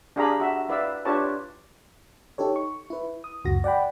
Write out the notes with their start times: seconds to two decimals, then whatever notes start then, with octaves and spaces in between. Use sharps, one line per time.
0.16 D4 G4 G#4 F5 A#5 B5
0.40 F#4 E5
0.69 E4 B4 D5 E5 F5 E6
1.05 D4 F4 G4 B4 C#5 A5
2.38 D#4 G4 A4 C#5
2.56 C#6
2.90 E4 B4
3.24 D#6
3.44 C#2 F#2 F#4 A#6
3.64 D5 F#5 G5 B5